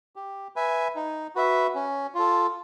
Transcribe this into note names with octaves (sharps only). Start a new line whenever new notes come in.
G4
B4 E5 G#5
D#4
F#4 B4 E5
C#4
F4 A4